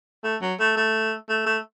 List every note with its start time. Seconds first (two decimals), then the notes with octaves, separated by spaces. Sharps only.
0.24 A3
0.42 F#3
0.59 A3
0.76 A3
1.29 A3
1.46 A3